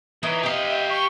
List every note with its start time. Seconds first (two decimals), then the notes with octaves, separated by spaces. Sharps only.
0.23 E3 D#4 A#4 C#5 E5
0.43 C4 G4 D#5 F5
0.89 C#6